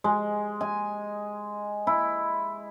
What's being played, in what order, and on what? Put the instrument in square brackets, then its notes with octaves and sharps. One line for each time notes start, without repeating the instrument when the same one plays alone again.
[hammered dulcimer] G#3
G#5
E4